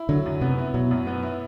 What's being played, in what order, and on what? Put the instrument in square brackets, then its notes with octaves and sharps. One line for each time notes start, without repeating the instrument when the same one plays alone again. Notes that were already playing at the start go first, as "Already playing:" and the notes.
Already playing: [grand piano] E4
[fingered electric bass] D3 [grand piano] F#3
[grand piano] F#2
[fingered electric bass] C3 [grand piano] B3
[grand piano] E4
[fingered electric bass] B2 [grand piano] F#3
[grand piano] F#2
B3
E4